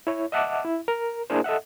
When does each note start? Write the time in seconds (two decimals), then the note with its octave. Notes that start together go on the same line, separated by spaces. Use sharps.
0.07 E4 C#5
0.32 D#5 E5 F#5 A5 D6
0.65 E4
0.88 A#4
1.30 A#3 D4 E4 G#4 A#4 C5
1.44 A4 D#5 E5 F#5